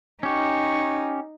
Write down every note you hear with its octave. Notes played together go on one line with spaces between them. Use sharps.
C#4 D#4 G4 C#6